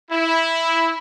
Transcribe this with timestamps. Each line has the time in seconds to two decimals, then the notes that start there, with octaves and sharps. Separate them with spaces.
0.11 E4